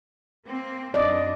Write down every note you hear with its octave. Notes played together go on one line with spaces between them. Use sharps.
A#3 C4
F#2 D4 D5 D#5